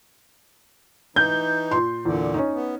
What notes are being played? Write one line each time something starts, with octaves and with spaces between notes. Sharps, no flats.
E3 D#4 G6
A#2 C6
E2 A#2 D3
C#4 D#4
B3